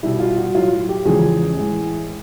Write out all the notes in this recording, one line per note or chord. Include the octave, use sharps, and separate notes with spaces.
B2 G3 E4
F4
F#4
A2 F#3 F4
G4
E2 C#3 F3 G#3 G#4
A2 E3 G#3